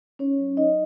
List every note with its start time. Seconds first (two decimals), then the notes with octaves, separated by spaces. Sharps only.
0.19 C#4 D#4 C#5
0.38 F#3
0.57 F#3 D#4 D#5